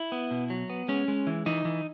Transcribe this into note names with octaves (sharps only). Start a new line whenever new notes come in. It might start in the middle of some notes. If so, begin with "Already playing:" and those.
Already playing: E4
B3
B2
F#3
B3
G#3 C#4
G#3
E3
E3 D#4
E3